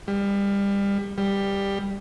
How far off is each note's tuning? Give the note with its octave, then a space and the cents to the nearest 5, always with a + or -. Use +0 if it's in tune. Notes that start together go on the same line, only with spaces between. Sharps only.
G3 +30
G3 +15